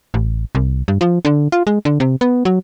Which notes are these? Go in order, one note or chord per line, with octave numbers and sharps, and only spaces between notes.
A1
C2
G2
F3
D3
F4
G#3
D3
C3
B3
F#3